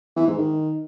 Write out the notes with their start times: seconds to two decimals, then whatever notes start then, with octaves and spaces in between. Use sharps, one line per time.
0.16 E3
0.27 G#2
0.38 D#3